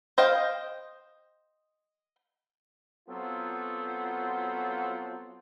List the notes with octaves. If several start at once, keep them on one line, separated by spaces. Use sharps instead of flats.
C5 D#5 F5 G5
F#3 B3 C4 F4 A4